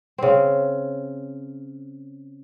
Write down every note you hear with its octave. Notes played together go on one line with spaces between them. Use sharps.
C#3 C4